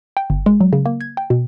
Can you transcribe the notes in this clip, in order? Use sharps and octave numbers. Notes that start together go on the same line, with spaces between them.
G5
G1
G#3
F#3
C#3
A#3
G#6
G5
B2